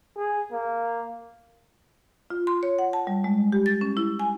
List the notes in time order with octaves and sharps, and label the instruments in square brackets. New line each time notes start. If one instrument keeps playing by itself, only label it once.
[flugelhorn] G#4
A#3
[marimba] F4
C6
C#5
F#5
A5
G3
G#3
G4
A6
C#4
E4
G#5